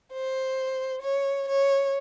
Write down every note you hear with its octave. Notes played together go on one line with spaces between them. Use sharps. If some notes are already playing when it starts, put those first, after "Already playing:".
C5
C#5
C#5